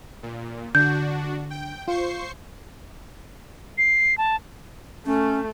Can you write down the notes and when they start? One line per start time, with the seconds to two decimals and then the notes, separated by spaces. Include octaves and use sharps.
0.23 A#2
0.75 D3 D4 F#4 G6
1.50 G5
1.88 F4 C5 C#6 C7
3.78 C7
4.18 A5
5.06 A3 C#4